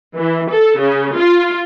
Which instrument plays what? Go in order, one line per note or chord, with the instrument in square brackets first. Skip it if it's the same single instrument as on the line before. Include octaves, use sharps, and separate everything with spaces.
[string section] E3
A4
C#3
F4